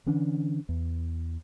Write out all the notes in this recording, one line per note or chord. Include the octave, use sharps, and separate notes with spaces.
D3 E3 C#4 D4
E2